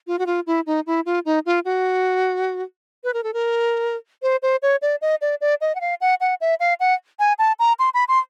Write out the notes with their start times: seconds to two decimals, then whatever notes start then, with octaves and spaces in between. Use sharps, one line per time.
0.07 F4
0.19 F#4
0.26 F4
0.47 E4
0.66 D#4
0.86 E4
1.05 F4
1.25 D#4
1.46 F4
1.65 F#4
3.04 B4
3.13 A#4
3.23 A4
3.33 A#4
4.22 C5
4.42 C5
4.62 C#5
4.82 D5
5.01 D#5
5.21 D5
5.41 D5
5.61 D#5
5.75 F#5
5.81 F5
6.01 F#5
6.20 F#5
6.41 E5
6.60 F5
6.80 F#5
7.19 G#5
7.39 A5
7.59 A#5
7.79 C6
7.94 B5
8.08 C6